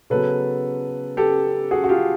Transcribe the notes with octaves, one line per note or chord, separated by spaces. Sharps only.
C#3 F#3 B3 A4 B4
G4 A4
F#4 G#4
F#4
F4 G4